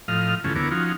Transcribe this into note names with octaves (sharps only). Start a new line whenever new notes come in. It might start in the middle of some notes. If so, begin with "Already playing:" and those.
A2 F3 D#5 F5 F6
G2 C#3 E3 A3 C#4 F4
D2 B3 E4 A#4 C#5 D6
F3 C#4 D#4 F4 F#4